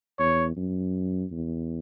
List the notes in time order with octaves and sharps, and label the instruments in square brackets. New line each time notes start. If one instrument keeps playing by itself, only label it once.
[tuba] E2 [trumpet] C#5
[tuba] F#2
E2